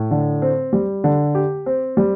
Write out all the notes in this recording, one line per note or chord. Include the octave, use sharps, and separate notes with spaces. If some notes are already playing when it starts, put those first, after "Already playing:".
Already playing: A2
D3
C4
G3
D3
G4
C4
G3